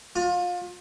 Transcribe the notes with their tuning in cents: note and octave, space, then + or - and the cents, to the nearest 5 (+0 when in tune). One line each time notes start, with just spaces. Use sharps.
F4 +30